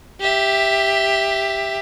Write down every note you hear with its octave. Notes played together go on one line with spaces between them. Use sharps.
G4 E5